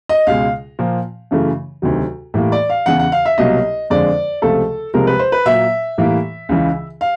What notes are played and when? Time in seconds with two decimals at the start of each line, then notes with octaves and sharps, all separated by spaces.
0.09 D#5
0.27 C#2 B2 G#3 F5
0.79 A#2 F3 A#3
1.31 F#2 C#3 E3 A3
1.82 D2 C3 D#3 F#3
2.34 A2 E3 G3 A#3
2.52 D5
2.70 F5
2.86 E2 C#3 E3 F#5
2.99 F#5
3.12 F5
3.26 E5
3.38 C2 B2 F#3 A#3 D#5
3.90 F2 D3 F3 G#3 D5
4.42 C#2 C3 F3 A3 A4
4.94 C2 C3 F3 G#3 A#4
5.07 B4
5.19 C5
5.32 B4
5.46 A#2 F#3 A#3 E5
5.98 A2 E3 G3 A#3
6.49 C#2 C#3 E3
7.01 F5